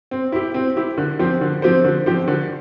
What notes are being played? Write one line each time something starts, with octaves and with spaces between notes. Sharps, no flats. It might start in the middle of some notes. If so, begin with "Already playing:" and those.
C4
E4 G4
C4
E4 G4
D3
F3 C4 G4 C5
D3
F3 C4 G4 C5
D3
F3 C4 G4 C5
D3